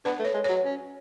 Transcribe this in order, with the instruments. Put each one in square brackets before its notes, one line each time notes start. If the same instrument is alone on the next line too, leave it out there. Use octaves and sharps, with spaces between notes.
[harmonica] B3 D4 [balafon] B4
[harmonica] A3
[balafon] C#5
[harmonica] G#3
[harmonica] F#3 [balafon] C#5
[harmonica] C#4